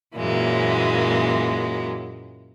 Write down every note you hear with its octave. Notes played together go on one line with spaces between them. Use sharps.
F#2 A#2 E3 F#3 G#3 A#3